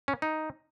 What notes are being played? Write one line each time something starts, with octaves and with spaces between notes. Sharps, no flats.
C#4
D#4